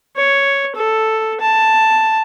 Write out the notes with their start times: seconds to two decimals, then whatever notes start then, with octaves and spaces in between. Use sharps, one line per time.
0.16 C#5
0.75 A4
1.41 A5